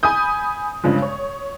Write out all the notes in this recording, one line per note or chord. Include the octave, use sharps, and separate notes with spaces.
G#5 B5 D#6 G6
G2 C#3 F3 G#3
C#5